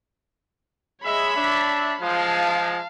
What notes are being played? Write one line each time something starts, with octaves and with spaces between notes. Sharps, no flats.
G#3 C#5 E5 B5
D4 E5
F3 G#3 F5 A5